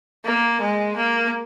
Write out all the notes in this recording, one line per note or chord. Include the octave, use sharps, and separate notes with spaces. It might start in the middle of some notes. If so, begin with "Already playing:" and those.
A#3
G#3
A#3